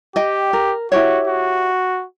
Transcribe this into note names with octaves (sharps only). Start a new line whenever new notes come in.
G4 D#5 G5
A#4
E4 F#4 G4 C#5
F#4